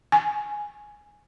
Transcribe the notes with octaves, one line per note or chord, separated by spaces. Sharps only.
G#5